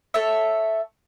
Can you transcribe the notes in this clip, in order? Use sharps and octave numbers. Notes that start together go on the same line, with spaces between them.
A4 C#5 E5